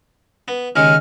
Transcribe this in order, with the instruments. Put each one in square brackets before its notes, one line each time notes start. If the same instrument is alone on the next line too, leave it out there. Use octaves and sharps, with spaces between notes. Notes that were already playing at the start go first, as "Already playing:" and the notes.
[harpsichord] B3
[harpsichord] D#2 C#3 G#3 [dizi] F6